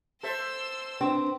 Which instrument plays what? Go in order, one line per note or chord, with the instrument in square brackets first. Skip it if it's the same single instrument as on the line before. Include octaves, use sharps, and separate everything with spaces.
[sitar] A4 C5 E5 [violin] C6 E6
[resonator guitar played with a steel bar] C4 [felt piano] D4 [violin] B4